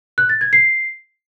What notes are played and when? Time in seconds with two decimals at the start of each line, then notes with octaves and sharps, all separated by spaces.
0.18 F#6
0.29 A6
0.41 G#6
0.53 C7